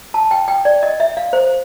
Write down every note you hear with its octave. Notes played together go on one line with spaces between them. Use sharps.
A5
G5
G5
D5
D#5
E5
F5
C5